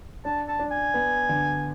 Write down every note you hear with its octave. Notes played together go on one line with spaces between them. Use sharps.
D4 A5
A5
D4
G#5
B3
D3